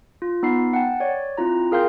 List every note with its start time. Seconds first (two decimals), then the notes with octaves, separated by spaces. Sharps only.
0.22 F4
0.43 B3 D#4 B5 C7
0.73 F#5 G5 A5
1.00 C#5 D5
1.38 C4 E4 F4 A#5
1.72 G#4 A#4 F5 G5 C6 G6